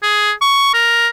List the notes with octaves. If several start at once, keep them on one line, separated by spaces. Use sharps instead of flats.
G#4
C#6
A#4